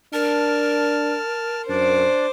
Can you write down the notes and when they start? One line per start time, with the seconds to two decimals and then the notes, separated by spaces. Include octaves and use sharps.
0.13 D4 A#4 A5 F6
1.69 F#2 D4 C5 D5 D6